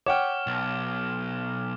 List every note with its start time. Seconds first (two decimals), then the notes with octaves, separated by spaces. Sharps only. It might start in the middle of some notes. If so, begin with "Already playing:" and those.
0.06 C#5 F#5 G5 D6 F6
0.47 B1